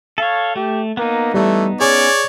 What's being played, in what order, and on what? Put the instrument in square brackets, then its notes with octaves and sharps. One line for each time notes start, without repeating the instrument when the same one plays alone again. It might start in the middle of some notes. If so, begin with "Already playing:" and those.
[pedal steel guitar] A4 C#5 [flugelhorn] F5
[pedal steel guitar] A3 [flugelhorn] G4
[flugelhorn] A#3 [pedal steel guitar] B3 D#4
[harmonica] E3 [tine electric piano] G3 [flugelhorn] A3
[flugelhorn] C#4 [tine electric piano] G#4 [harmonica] C#5 D5